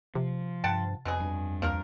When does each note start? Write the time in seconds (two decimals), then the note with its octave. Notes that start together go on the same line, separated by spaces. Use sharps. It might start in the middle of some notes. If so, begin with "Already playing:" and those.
0.15 C3 F3
0.64 G2 F#5 G5 A5
1.05 F2 B2 F#3 G#4
1.21 G2
1.62 D#2 F3 A#3 A#4